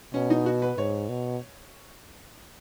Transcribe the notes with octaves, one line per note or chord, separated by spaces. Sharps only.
B2 C#4
D#4
F#4
B4
G#2 C#5
B2